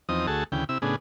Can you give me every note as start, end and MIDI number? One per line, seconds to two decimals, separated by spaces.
0.09 0.27 40
0.09 0.27 53
0.09 0.27 60
0.09 0.27 63
0.09 0.27 87
0.27 0.44 38
0.27 0.44 57
0.27 0.44 66
0.27 0.44 68
0.27 0.44 81
0.52 0.64 38
0.52 0.64 49
0.52 0.64 52
0.52 0.64 79
0.69 0.78 48
0.69 0.78 64
0.69 0.78 88
0.82 0.96 45
0.82 0.96 49
0.82 0.96 59
0.82 0.96 62
0.82 0.96 68